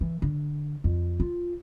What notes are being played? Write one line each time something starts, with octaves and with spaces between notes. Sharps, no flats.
E3
D3
F2
F4